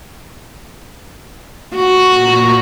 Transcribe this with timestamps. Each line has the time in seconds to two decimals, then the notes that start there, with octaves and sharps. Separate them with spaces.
1.75 F#4
2.09 A#2 A#5